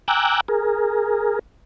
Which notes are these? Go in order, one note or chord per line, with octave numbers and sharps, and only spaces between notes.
G5 G#5 A#5 D6 E6 F#6
G#4 A#4